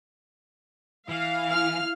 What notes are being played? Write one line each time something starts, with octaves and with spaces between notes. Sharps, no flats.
E3 F5
E4 F6